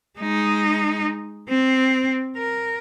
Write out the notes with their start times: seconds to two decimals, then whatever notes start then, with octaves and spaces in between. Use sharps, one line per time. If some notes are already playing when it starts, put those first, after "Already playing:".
0.20 G#3 D#4
1.49 C4
2.36 A#4